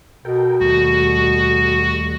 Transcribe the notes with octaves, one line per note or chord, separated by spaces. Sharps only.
B2 A4 A#4 G5
D#2 G3 A3 F#4